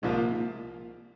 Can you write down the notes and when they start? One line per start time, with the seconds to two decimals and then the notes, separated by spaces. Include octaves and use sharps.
0.02 C2 G#2 C3 F3 A#3 F4
0.18 A#2
0.34 A#2